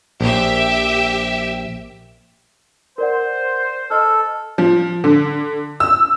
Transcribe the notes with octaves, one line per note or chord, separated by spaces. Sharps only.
A#1 G4 E5
A#4 C5 D5 F#5
A4 D#5 F6
F3
D3
E6